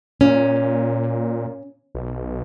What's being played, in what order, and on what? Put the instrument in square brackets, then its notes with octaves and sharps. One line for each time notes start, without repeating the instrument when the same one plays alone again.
[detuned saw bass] A#2 [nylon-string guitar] C#4
[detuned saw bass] B1